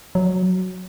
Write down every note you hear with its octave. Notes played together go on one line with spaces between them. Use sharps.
F#3